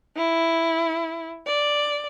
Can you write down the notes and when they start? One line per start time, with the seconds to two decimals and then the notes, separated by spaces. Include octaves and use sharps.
0.16 E4
1.47 D5